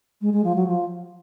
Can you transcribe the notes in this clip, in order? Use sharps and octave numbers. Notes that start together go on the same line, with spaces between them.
G#3
G#3
F3
F#3
F3